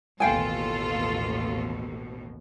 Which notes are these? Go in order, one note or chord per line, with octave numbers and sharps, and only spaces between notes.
A1 D#2 B2 F4 A4 F5 G5 G#5